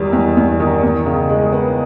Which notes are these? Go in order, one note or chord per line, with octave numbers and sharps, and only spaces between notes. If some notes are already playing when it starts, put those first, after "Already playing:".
Already playing: E2 D#3 G3
E2
E2
D#3
E2
C#3
G#3
B3